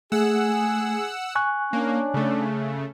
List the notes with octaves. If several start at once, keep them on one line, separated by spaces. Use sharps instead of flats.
A3 G#4 F#5 E6
G#5 C#6 F#6
A#3 C#4 D4
C#3 A3